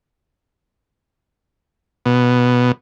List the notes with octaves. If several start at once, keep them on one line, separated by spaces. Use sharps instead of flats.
B2